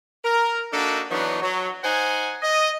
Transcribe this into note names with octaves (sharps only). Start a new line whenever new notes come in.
A#4
A#3 D4 D#4 F#4 A4
E3 F#3 B3 D4 D#4
F#3
D#4 C5 F#5 G#5
D#5